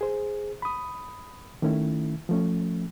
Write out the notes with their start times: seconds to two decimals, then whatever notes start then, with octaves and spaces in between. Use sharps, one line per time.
0.01 G#4 C5
0.62 B5 D#6
1.62 D#3 A3 C#4 E4
2.29 F3 A3 C#4